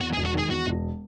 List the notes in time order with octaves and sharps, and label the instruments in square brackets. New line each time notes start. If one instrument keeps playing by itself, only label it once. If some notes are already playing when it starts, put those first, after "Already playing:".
[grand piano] E2 [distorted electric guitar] F#4
[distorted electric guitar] G#4
[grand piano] E1
[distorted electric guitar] F#4
[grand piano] D#3 [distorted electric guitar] G#4
[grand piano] E2 [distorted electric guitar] F#4
[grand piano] E1